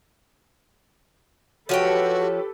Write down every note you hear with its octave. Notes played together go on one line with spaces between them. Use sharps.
F3 F#4 G4 A4 B4 C#5 G5